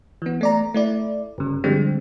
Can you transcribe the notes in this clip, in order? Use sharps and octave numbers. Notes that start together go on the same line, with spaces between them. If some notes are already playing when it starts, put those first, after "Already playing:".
E3 B3
A3 D5 A#5
A3 E4 D5
G1 C#3
D3 F3 G3 G#3 C4